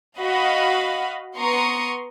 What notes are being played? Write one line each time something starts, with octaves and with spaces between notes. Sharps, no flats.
F#4 D#5 F5 B5
B3 A#5 C6 C#6 D#6